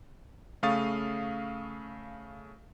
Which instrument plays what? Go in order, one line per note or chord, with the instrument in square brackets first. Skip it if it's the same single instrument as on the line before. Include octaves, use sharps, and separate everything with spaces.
[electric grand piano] C#3 A3 F5 C#6 D#6 A6